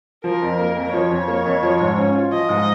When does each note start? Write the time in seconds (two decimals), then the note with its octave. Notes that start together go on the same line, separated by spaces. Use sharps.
0.24 F3 A#4
0.42 F2
0.59 A#3
0.76 F2
0.93 F3 C#5
1.10 F2
1.28 A#3
1.45 F2
1.63 F3
1.80 G#2
1.98 C#4
2.15 F4
2.32 F3 D#5
2.49 G#2